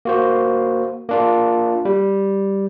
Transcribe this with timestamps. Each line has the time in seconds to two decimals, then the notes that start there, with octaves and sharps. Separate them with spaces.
0.05 A#3 F#4 C5
1.09 A#3 D4 F4
1.85 G3